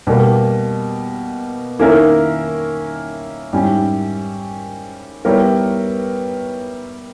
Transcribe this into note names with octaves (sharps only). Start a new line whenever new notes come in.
B2 G3 A#3
D#3 A#3 C#4 E4 A#4
G#2 G3 C#4 E4
G3 B3 E4 A#4 C#5